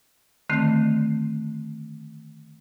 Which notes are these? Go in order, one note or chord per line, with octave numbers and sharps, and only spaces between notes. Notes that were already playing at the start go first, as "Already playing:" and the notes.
D3 D#3 A3 C4